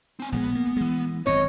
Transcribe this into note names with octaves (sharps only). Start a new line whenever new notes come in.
C4 G#5
A#1 D3 G#3 B3
A#3
E3 G#3
G#1 F#2 C4 C#5 D#5